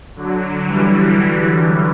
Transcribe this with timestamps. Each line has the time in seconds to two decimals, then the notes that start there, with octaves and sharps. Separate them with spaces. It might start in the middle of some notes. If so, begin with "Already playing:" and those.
0.16 D3 F#3
0.66 E3 G3